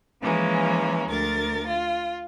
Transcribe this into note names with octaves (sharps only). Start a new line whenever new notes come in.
E3 F3 G#3 A#3 C#4
D2 A#4 A6
F4